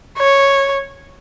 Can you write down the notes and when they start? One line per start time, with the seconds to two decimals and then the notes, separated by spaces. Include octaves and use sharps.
0.18 C#5